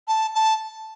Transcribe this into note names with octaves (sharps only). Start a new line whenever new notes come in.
A5
A5